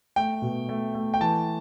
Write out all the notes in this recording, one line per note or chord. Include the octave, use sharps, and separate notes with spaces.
A3 G5
B2
A3
A3
G5
E3 A5